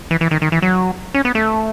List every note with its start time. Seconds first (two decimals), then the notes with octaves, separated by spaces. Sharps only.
0.11 E3
0.21 E3
0.31 D#3
0.42 D#3
0.52 E3
0.62 F#3
1.14 C#4
1.25 B3
1.35 A3